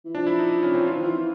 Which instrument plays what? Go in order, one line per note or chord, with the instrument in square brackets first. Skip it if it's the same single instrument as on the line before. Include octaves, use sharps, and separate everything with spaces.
[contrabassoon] E3
[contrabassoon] F3 [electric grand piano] D4
[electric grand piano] E4
D#4
C#4
C4
[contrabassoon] E3 [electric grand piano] F4
[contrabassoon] D#3
E3